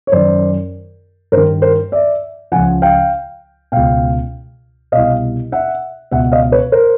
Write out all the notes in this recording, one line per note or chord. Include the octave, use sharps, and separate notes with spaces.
C#5
F#2 D#3 C5 D5
G2 D#3 A#4 C5
A#4 C5
D5 E5
C#2 C#3 F3 F#5 G#5
F5 G5
C#2 B2 F5 G5
C2 B2 D#5 F5
E5 F#5
C#2 B2 E5 F#5
D#5 F5
B4 C#5
A#4 C5